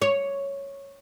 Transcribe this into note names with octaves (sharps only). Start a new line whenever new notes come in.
C#5